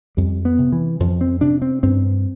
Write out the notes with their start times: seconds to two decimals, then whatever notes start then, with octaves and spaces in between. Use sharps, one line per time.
0.17 F2 G3
0.45 B3
0.58 C3
0.72 E3
1.00 F2 F3
1.21 C4
1.41 C3 D4
1.62 C4
1.83 G2 C4